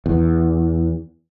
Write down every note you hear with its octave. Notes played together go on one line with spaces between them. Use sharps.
E2